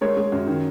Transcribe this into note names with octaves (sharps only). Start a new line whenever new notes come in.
G#3 A#4 C#5
G#3
F#2
D#3